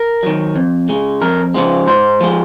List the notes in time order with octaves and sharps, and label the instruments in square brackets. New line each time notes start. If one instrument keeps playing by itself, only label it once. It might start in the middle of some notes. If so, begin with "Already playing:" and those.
Already playing: [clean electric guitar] A#4
D#3 F#3
F2
C#3 G#3
F2 A#4
C#3 F3 G#3
G#2 C5
F3 G#3